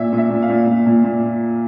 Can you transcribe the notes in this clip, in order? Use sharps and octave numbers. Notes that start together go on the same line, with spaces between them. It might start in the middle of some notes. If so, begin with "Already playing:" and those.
Already playing: A#2 E5
A#2
E5
A#2
F5
A#2
A#2
A#2
A#2